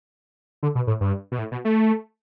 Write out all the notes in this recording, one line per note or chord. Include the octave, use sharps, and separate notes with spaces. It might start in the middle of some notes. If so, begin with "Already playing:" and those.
D3
B2
A2
G2
B2
A2
B2
A3